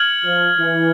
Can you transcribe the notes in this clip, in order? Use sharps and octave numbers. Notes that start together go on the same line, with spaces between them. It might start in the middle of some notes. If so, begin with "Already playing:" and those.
Already playing: F6 G#6 C#7 F#7
F3
E3